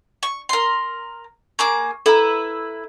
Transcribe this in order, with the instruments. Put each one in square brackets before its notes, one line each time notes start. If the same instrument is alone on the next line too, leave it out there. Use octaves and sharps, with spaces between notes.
[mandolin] C#6
A#4 C6
[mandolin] A#3 G#4 D6 [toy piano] C#6
[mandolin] E4 B4 [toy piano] A4 A#5